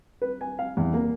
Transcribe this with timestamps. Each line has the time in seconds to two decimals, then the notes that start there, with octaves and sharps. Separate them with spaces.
0.22 B4
0.41 G#5
0.59 F5
0.77 E2
0.94 A#3